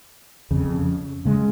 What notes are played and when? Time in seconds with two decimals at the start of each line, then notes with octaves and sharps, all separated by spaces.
0.51 F2 C#3
1.25 C#3 G#3